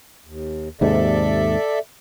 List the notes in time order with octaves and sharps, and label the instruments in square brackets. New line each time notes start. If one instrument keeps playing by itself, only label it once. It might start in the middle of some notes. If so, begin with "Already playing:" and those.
[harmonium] D#2
[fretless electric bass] D#2 G#2 C3 [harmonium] A4 D5 E5